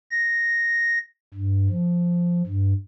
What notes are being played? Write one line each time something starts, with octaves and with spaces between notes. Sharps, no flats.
A#6
G2
F3
G2